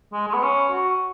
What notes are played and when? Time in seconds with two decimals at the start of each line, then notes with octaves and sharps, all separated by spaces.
0.13 G#3
0.27 G#3
0.34 B3
0.43 C#4
0.71 F#4